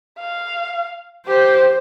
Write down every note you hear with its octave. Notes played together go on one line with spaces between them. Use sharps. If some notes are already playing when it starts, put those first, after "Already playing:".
F5
G4 C5